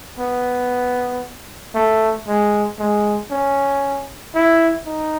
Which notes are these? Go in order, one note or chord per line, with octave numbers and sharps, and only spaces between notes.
B3
A3
G#3
G#3
C#4
E4
D#4